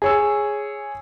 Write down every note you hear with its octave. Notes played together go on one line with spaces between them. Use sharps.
G#4 C#5 E6